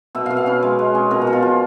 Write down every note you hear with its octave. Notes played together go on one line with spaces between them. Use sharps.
B2 E5
B2 F5
F5
C#4 B4
G#3
G#3
C#4
B2 A#4
F#4
B2
F4
F3